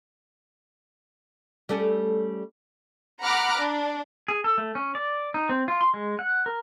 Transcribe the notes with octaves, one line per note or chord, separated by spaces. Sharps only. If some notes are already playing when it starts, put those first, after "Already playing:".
G3 A3 C#4
F#5 A#5 B5 D6 F6 F#6
D4
G#4
A4
A3
C#4
D5
D#4
C4
F4
C6
G#3
F#5
A#4